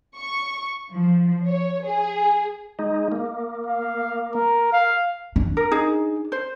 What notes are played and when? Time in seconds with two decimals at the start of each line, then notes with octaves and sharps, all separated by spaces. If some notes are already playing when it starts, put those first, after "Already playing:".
0.18 C#6
0.92 F3
1.46 C#5
1.87 G#4
2.79 G#3 D#4
3.12 A#3
3.67 F5
4.35 A#4
4.73 F5
5.36 D4
5.57 A#4
5.71 D#4 G#4
6.32 C5